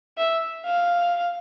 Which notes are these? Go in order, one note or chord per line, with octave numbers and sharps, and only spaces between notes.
E5
F5